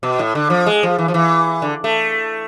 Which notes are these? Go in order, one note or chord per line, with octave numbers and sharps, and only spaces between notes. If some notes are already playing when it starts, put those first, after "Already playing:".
B2
A2
D3
F3
G#3
F3
E3
F3
E3
D3
A3